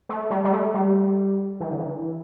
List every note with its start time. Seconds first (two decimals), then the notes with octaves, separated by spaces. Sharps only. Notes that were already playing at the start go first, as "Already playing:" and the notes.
0.09 A3
0.30 G3
0.44 G3
0.53 A3
0.74 G3
1.60 E3
1.71 D3
1.80 E3